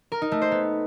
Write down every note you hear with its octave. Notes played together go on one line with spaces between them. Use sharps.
A#4
D#4
A3
C5
B3